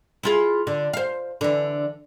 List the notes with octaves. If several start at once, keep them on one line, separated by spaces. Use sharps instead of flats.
E4 F4 G#4
D3
C5 F5
D3 E3